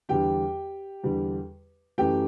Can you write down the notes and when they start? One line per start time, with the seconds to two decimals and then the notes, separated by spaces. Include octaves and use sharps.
0.09 E2 D3 G3 G4 G5
1.03 E2 D3 G3
1.98 F#2 E3 A3 G4 G5